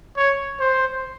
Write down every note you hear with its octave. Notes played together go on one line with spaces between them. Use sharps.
C#5
C5